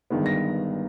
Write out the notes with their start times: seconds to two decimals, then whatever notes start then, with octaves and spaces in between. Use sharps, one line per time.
0.10 G1 G2 D#3 G#3 B3
0.26 A#6